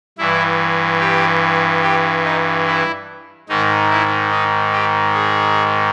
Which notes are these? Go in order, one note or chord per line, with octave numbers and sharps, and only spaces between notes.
G2 E3 E4
G4
G4
D#4
E4
G#2 D#3 D#4
E4
D#4
G4
G#4